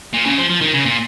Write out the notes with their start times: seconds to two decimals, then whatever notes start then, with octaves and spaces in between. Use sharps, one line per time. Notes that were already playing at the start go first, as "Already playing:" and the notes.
0.13 A#2
0.26 C#3
0.38 F3
0.50 F3
0.61 D#3
0.74 C#3
0.86 A#2